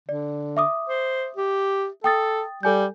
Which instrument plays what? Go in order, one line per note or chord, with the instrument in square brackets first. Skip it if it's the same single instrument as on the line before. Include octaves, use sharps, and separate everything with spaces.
[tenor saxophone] D3 [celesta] D5
[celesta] E5 D6 D#6
[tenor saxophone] C5
G4
[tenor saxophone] A4 [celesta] G5 D#6 A6
[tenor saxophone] G3 [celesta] A4 G#5 G6